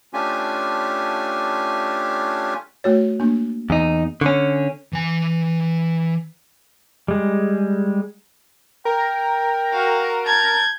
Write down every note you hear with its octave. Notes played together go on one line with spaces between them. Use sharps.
A3 C#4 D4 F4 G4 G#5
A3 F#4 C#5
A#3 D4
E2 D#4
D3 C#4 C#6
E3 G#5
G3 G#3
A#4 G5
F#4 F5
A5 G6 G#6